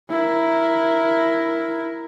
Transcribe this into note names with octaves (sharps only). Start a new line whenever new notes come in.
E4 A#4